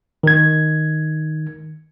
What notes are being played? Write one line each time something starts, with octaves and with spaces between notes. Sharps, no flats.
D#3 G#6